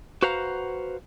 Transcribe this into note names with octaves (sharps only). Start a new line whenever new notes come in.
F#4 B4 C5 F5 F#5 A#5